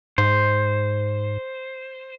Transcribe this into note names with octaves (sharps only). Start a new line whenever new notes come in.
G#2 C5